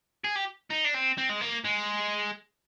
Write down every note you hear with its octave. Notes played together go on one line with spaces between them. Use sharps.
G#4
G4
D#4
D4
C4
C4
G#3
A#3
G#3